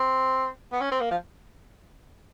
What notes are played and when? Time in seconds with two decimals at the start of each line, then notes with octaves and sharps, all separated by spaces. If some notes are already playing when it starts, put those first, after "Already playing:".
Already playing: C4
0.72 B3
0.81 C#4
0.91 C4
1.01 A#3
1.11 F3